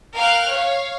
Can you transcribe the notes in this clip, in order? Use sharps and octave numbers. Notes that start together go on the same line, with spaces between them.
A#4 F5 G5 F6 F#6
C#5 F5